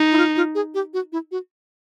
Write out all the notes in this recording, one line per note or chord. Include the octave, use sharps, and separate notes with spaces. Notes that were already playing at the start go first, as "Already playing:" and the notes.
Already playing: D#4
E4
F4
F4
G#4
G4
F#4
E4
F#4